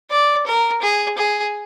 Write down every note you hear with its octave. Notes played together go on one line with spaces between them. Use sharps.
D5
A#4
G#4
G#4